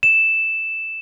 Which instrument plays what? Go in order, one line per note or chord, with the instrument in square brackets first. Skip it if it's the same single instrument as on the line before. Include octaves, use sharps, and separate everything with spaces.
[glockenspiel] E7